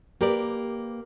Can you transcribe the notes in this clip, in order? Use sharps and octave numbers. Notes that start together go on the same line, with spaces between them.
A#3 G4 A#4 B4 D5